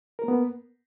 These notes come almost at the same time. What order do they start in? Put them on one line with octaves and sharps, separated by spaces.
A#4 A#3 B3